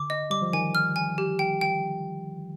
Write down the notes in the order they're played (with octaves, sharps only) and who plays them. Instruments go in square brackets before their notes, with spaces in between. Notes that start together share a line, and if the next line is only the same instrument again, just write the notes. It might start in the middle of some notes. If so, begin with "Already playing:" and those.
Already playing: [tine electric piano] D3 [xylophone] D6
[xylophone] D#5
[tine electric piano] G3 [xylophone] D6
[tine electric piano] F3
[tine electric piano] D#3 [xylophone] G#5
[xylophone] F6
G#5
G4
G5
G5